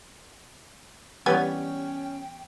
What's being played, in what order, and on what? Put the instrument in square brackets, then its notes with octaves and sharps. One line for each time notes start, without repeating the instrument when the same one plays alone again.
[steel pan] E3 G3 C#5 [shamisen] B3 G4 G#5 [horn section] C#4 [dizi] G5